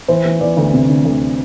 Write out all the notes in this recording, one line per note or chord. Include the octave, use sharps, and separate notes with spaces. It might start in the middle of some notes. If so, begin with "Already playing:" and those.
E3 C5
E3
E3 D5
D2
C3
D2
D2